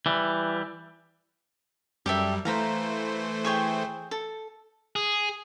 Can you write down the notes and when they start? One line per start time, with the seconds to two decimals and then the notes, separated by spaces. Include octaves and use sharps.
0.06 E3 G3
2.06 F#2 G3 G4 A4 E5
2.45 E3 A3 C5 F5 A#5 B5
3.44 G#4 C#5 G5
4.11 A4
4.96 G#4